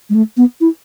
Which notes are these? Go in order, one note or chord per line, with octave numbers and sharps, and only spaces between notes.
G#3
A3
B3
E4